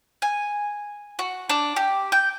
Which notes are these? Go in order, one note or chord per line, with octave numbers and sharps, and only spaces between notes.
G#5
F#4
D4
G4
G5